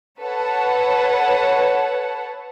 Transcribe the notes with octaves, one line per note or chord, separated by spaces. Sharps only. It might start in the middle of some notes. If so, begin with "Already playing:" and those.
A4 B4 C#5 F#5 A5